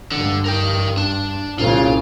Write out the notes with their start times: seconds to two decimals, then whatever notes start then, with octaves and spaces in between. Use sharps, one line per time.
0.12 G2 D3
0.45 A#4 G5
0.97 D4
1.59 C2 A#2 C#3 F4